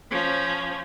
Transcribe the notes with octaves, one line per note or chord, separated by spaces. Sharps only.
F3 C#4